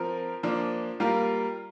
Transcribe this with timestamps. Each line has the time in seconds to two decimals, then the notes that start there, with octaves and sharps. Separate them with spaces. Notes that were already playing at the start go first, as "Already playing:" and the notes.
Already playing: F3 C4 A#4
0.43 F3 A#3 D4
1.00 G3 A#3 F4 A#4